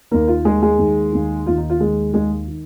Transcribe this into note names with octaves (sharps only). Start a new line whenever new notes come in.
D#2 D#3 A#3 A#4
F4
D#2 D#3 G#3 G#4
G#3 G#4
D#2 D#3
D#2 D#3
D#2 D#3 F4
D#4
F4
D#2 D#3 G#3 G#4
D#2 D#3 G#3 G#4
D#3